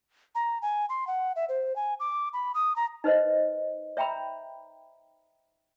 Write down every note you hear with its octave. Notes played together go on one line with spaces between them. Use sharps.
A#5
G#5
C6
F#5
E5
C5
G#5
D6
B5
D#6
A#5
D#4 B4 C5 D#5
C#5 E5 G5 A#5 B5